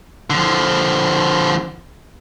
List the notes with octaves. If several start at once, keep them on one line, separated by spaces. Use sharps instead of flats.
D3 F3